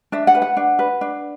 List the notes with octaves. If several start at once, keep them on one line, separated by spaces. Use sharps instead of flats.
D4 E5
F#5
B4
F#5
D4
B4
D4